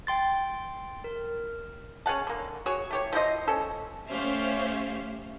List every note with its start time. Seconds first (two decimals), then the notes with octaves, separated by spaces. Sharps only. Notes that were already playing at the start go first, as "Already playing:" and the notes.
0.07 G5 C6 A6
1.04 A#4
2.06 C#4 G#4 F#5 A5
2.27 D3 A#3
2.66 F#4 G#4 C#5
2.91 A3 G4 C#5
3.13 F3 E4 C5 D#5
3.48 C#4 A4
4.10 A3 C#4 G4 C5 E5 F5